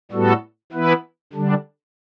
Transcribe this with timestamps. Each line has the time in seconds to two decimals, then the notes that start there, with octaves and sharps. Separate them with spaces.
0.11 A2 G3 B3 F#4 A4
0.72 E3 B3 E4 B4
1.33 D3 G3 D4